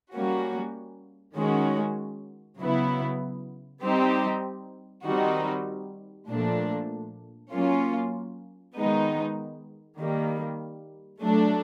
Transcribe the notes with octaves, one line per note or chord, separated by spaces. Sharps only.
G3 A#3 C#4 F#4
D#3 G#3 C#4 F#4
C#3 F#3 B3 E4
G3 C4 D#4 G4
D#3 G3 C4 D#4 F#4
A#2 F3 A3 D4
F#3 A#3 C#4 F4
D#3 G#3 B3 D#4
D#3 G3 A#3
F#3 A3 D4